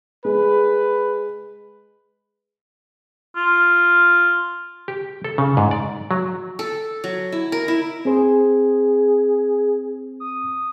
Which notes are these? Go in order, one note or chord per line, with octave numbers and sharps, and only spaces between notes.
G#3 B4
F4
G4
A4
C#3
G#2
D5
F#3
A4
F#3
E4
A#4
E4
C4 G#4 C5
D#6